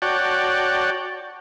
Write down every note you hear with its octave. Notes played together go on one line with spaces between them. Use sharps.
F#4 C#5 D5 G5 A5